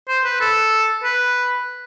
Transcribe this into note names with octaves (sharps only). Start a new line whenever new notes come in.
C5
B4
A4
B4